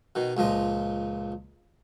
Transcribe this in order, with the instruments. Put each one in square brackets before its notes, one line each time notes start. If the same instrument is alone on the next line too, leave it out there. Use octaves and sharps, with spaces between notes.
[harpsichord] B2 D#3
C#2 A#2 F3 D#5